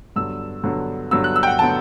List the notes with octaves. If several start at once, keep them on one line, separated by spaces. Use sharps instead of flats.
G2 D3 F#3 B3 E6
G2 D3 F#3 B3
G2 D3 F#3 B3 E6
F#6
E6
G5
F#5
D3 F#3 B3 A5